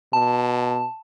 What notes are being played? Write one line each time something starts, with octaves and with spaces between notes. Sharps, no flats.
B2 A5